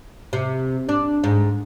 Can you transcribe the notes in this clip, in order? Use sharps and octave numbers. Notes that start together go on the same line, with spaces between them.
C3
D4
G#2